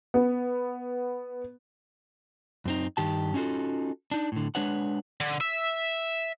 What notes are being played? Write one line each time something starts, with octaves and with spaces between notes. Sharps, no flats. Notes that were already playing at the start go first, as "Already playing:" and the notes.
B3
F#2 C4 D#4
G2 D#3 G4 A5
C#4 D#4 F4 F#4 A4
D4 D#4
A2 D3
G#3 D4 B4 C#5 F#5
D3
E5